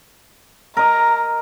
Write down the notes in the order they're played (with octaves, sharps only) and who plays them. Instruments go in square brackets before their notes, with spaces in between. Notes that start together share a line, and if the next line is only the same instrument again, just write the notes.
[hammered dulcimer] A#4 D#5 [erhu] A#5